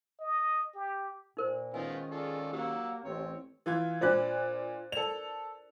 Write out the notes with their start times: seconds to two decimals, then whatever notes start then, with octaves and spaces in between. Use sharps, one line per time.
0.20 D#5
0.75 G4
1.37 A#2 D#4 A#4 C5
1.74 D#3 G#3 B3 C#4 D#4 F4 G#5
2.11 F4 G#4 A4 D5
2.53 F#3 A#3 G4 F#5 E6
3.04 A1 C4 C#5
3.66 E3 F4 G#6
4.01 A#2 D4 F4 C5 D5 F#6
4.92 A4 A#4 D5 F7